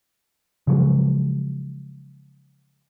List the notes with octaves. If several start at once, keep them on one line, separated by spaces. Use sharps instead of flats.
C#3 F3 F#3 G#3